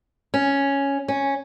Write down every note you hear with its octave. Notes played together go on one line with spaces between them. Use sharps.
C#4
C#4